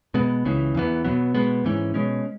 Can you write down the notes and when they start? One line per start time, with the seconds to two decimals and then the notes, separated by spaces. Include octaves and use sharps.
0.14 B2 G#3 B3
0.45 C#2 C#3 E3
0.74 E2 E3 B3
1.04 B2 F#3 B3
1.35 B2 G#3 B3
1.64 G#2 E3 C#4
1.94 B2 G#3 C#4